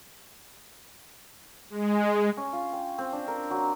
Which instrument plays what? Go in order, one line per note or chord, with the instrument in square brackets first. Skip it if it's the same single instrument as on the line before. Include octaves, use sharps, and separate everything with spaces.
[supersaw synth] G#3
[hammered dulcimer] C#4
F4
G5
C4
D4
A#4
F#3